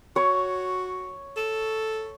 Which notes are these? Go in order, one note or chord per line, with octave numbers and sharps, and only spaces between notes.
F#4 C#5
A4